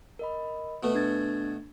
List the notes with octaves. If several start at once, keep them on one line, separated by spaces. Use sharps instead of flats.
A#4 D#5 B5
B2 A3 B3
D4 G#6 A6